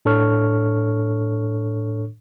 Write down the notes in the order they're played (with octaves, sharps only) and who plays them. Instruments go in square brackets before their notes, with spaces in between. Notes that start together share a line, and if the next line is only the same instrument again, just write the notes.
[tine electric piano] A2 D4 A4 C#5 C#6 F6